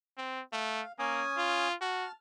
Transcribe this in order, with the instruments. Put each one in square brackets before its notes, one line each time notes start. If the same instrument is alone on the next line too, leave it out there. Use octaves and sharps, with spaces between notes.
[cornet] C4
[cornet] A3 [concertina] F5
[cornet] A#3 [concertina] C#4 G#5 D#6
[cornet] F4
[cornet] F#4 [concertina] A5 F6